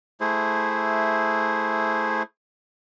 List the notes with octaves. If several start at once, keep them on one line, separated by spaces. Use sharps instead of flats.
A3 E4 G#4 C5